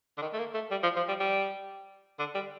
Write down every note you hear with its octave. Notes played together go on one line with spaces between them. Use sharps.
D3
D#3
A3
A#3
A3
G3
F3
F3
G3
G3
D3
G3